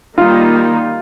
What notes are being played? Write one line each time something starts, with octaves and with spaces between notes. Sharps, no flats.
D#3 G3 A#3 D#4 F4